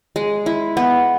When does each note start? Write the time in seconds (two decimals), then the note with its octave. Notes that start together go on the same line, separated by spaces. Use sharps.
0.16 G#3
0.46 E4
0.77 B3